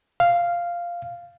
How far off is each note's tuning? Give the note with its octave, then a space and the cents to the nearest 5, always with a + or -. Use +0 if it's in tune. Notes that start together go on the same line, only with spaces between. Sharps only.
F5 -5